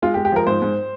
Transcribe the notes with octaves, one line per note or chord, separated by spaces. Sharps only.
G#3 F4
G4
G#3
G4
F3 A#4
G#2 C5
G#2